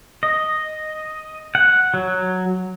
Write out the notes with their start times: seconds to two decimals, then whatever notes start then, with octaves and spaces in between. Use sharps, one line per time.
0.23 D#5
1.55 F#5
1.94 F#3